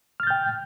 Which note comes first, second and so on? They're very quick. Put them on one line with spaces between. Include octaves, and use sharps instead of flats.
F6 A6 G6 G5